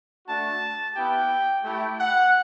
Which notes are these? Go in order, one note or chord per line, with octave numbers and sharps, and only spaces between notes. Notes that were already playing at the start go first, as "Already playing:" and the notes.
A3 D4 F#4 A5
B3 E4 G4 G5
A3 E4 G4 G5
F#5